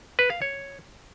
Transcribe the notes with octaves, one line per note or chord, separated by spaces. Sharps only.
B4
F5
C#5